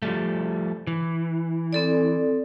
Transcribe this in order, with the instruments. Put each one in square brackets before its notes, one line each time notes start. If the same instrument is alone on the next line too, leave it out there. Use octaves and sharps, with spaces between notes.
[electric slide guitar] F3 G3 A3
E3
[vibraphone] C4 A4 D5